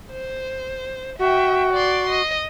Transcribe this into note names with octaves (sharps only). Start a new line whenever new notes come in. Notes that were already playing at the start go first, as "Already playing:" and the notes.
C5
F#4 E5 G5
D5 C6
D#5